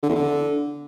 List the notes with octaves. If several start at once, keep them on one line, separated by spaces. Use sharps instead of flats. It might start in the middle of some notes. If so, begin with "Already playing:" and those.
D3
E2
D3